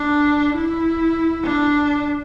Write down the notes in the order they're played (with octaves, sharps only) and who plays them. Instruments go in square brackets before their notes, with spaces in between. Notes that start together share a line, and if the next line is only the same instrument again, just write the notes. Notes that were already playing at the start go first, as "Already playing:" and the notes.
Already playing: [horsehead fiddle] D4
E4
D4